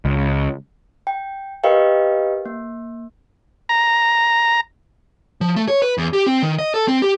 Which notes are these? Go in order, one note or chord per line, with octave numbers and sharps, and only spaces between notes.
C#2
G5
G4 A#4 B4 D#5 F5 G5
A#3
A#5
F3
A3
C#5
B4
E2
G4
C4
D#3
D#5
A4
C4
G4